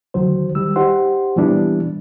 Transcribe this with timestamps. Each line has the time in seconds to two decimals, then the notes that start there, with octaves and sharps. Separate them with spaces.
0.14 D2 D#3 F#3 C5
0.55 D#3 G3 E6
0.76 D#4 G4 C5 F#5 C6
1.36 A#2 E3 G3 B3 D4 E4